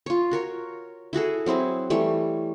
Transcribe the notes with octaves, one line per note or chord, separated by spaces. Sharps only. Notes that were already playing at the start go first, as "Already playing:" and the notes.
F4 C#5
F#4 A#4 C#5
E4 F#4 G#4 A4
F#3 C4 E4 G#4
E3 G3 A3 C#5